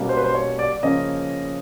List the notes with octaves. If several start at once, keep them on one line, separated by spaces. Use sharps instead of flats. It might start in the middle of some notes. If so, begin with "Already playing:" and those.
Already playing: B2 G3 A#3 C#4
C5
B4
C5
C#5
D5
D5
C#3 F3 A#3 C#4 D#5